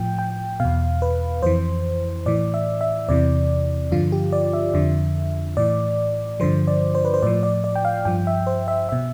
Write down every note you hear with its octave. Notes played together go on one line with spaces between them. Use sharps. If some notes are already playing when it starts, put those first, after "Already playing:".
Already playing: A2 F3 G5
G5
E2 B2 F5
B4
F2 E3 C5
A2 E3 D5
E5
E5
E2 C3 E3 D5
G2 D3 F3 F4
G4
D5
E5
F2 D3 F3
A2 E3 D5
G2 D3 F3 C5
D5
C5
B4
C5
A2 F3 D5
D5
D5
G5
F5
G2 F3 G5
E5
C5
E5
B2 E5